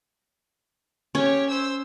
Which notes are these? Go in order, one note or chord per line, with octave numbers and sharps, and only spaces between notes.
C#4 G4 C#5
C5 E6